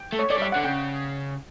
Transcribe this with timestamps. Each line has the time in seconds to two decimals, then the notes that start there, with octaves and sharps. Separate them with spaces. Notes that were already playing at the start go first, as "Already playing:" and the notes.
Already playing: G5
0.12 A3
0.19 C#5
0.30 A3 D5
0.38 G3
0.42 E5
0.52 D3 F#5
0.64 C#3 G5